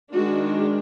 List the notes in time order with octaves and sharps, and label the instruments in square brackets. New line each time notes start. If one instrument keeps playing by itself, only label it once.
[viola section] D#3 G#3 D4 F#4